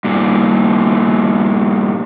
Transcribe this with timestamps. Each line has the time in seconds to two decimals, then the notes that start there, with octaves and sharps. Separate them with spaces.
0.04 G2 A#2